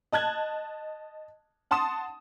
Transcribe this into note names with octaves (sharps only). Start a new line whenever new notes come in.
D#5 A5 F#6 G#6
F#5 A5 C6 D#6 E7